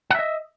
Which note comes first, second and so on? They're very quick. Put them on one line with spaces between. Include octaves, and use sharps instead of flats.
F#5 E5 D#5